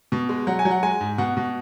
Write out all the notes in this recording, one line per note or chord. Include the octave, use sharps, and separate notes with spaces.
B2
G#3
F#3 F#5
G#5
F#3
F#5
G#3 G#5
G#2
B2 F#5
B2